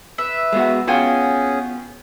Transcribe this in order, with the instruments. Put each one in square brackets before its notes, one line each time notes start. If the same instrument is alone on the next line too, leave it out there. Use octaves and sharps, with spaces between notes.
[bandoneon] B4 [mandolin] E5
[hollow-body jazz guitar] G#3 B3 F#4
[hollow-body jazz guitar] B3 F4 [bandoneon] C#4 G#4 [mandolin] F#4 G5 G#5